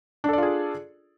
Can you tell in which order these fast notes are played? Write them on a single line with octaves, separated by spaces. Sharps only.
D4 A4 D5 F4 G#4